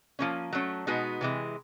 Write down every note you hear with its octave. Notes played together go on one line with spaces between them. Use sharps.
F3 A#3 C#4
F#3 A3 C#4
B2 G#3 B3 D#4 F#4
C3 E3 G#3